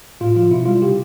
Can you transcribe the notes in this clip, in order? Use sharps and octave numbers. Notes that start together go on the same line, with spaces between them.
A2 F4
F3 F4
B2 E4
G3 F4
C3 G4